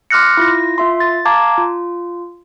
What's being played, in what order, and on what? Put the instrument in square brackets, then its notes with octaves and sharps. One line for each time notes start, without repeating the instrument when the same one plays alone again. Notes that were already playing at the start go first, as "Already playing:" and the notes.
[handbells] C6 D6 F6 F#6 A#6 C#7
E4 F4 A#6
F4 E5 C6
A6
F5 A5 A#5 D6 G#6
F4